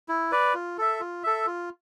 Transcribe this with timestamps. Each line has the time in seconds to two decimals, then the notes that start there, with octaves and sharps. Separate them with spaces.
0.09 E4
0.32 B4 D5
0.54 F4
0.78 A4 E5
1.00 F4
1.24 A4 E5
1.47 F4